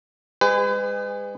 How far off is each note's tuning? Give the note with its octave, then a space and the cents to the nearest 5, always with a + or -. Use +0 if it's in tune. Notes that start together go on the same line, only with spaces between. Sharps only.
G#3 -40 G#4 -25 B4 +40